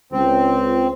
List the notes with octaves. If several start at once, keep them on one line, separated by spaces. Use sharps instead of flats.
C#2 C4